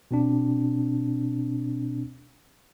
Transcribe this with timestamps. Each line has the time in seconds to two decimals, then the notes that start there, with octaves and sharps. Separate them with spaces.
0.11 B2 C4 D4